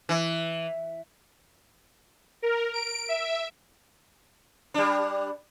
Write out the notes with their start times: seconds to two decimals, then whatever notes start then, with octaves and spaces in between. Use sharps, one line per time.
0.09 E3
2.42 A#4
2.74 D7
3.09 E5
4.74 G3 D4